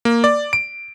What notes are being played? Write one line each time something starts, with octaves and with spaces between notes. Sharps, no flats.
A#3
D5
D7